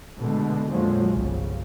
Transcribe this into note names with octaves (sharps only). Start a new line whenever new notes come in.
B2 D3 G#3 A3
F2 A#2 D3 F3 F#3 G#3
G1 C2 C#3